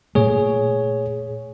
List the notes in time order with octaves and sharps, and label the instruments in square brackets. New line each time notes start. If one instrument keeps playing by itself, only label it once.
[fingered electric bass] A#2 A3 [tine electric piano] G#4 C#5